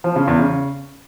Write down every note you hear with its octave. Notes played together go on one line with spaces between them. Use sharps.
F3
C#3
E2
C#3